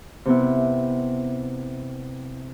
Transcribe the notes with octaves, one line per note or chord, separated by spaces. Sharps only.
C3 B3 E4